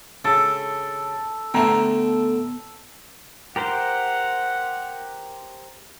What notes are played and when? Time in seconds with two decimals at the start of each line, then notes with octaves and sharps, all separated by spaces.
0.25 C#3 A4
1.54 D3 A3 B3 G5 A#5
3.56 G4 A#4 C5 F#5